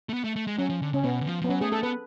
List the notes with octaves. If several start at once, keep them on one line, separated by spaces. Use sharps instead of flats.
A3
B3
A3
A3
G#3
F#3 C#4
F3
D3
C#3 C#4
B2 B3
D3
F3
F3
B3
F#3 C#4
A3 G#4
A3 A4
B3 B4